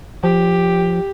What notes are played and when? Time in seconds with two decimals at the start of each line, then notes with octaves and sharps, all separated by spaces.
0.24 F3 G4